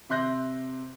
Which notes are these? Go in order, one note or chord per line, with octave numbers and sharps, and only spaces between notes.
C3 E5 C6 F#6 G6 A#6